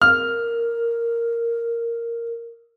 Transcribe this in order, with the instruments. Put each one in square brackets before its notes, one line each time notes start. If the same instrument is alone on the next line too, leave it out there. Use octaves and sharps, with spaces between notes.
[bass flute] A#4 [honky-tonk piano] F6